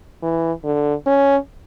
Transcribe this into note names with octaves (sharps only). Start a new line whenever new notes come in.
E3
D3
C#4